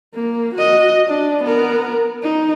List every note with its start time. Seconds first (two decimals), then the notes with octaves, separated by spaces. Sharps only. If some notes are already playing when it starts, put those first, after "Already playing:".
0.14 A#3
0.54 F#4 D#5
1.07 D4
1.43 B3 A#4
2.22 D#4